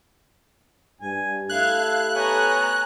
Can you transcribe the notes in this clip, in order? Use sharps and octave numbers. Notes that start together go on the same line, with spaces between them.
G2 G#5
A3 E4 G4 A4 F5 F#6 G#6
B3 C#5 G#5 A#5